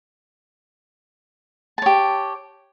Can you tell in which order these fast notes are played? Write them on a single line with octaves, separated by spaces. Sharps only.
A5 C#5 G4